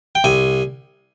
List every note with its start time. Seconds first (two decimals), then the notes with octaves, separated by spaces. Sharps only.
0.15 G5
0.24 C2 G#5